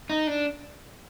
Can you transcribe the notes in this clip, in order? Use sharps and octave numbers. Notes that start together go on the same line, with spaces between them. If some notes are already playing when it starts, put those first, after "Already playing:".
D#4
D4